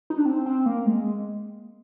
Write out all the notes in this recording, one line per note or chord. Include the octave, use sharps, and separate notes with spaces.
D#4
D4
C4
C4
A#3
G#3